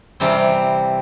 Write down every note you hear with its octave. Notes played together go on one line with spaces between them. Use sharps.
C3 E3 G3 C4